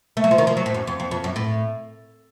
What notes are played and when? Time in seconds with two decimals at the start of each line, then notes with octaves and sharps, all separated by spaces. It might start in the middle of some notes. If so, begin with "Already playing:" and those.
0.17 A3
0.24 F#3
0.31 F3
0.38 D#3
0.47 F3
0.57 F#3
0.66 A2
0.74 F#2
0.87 F2
1.00 F2
1.11 F2
1.24 F#2
1.36 A2